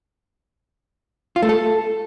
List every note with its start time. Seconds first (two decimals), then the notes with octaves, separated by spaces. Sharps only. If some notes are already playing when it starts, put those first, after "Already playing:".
1.36 F4
1.42 A3
1.49 A4